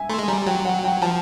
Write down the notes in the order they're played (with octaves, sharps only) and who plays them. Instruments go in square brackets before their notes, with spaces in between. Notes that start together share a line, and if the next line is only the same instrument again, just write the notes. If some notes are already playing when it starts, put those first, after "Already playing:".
Already playing: [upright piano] E5 G#5
[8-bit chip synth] A3 [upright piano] C6
[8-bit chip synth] G#3
[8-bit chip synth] G3 [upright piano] A#5
[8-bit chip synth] F#3 [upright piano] G5
[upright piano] F#5
G5
[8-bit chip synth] F3 [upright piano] A5